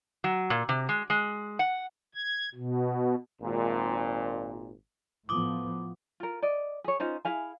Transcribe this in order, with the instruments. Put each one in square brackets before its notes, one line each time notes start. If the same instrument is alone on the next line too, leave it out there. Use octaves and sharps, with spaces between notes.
[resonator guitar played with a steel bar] F#3
A#2
C3
G#3
G#3
F#5
[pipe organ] G#6
B2
[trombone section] G#1 A#2
[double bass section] A2 F3 B3 [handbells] D6 D#6
[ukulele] F4 A#4
D5 D#5
G#4 C#5
C#4 D#4 F4 C5
E4 G#4 F5 G#5